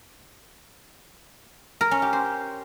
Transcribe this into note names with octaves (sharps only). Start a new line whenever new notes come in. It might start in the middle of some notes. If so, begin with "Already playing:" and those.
A#4
C#4
G4
C5